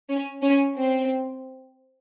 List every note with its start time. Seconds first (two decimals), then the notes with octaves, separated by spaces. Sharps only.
0.09 C#4
0.42 C#4
0.76 C4